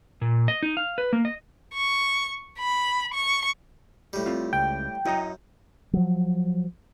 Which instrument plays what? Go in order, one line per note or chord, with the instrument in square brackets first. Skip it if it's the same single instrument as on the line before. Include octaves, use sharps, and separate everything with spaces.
[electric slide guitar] A#2
D#5
D#4
F5
B4
A#3
D#5
[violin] C#6
B5
C#6
[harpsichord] A2 G3
[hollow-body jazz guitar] C4 F4
[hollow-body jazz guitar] C#2 [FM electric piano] G5
[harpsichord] F#2 [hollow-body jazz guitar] E4 D#5 A#5
[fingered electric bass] F3 F#3